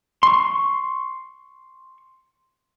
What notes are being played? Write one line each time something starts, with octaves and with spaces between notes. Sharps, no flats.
C6 C#6